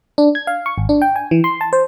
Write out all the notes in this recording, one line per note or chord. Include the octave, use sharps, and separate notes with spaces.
D4
G#6
F5
C#6
G#1
D4
G5
G#5
E3
C6
A5
C5